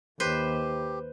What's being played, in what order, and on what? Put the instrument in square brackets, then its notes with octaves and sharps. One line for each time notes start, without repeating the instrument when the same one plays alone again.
[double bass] D#2 [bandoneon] G4 [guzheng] B4 C5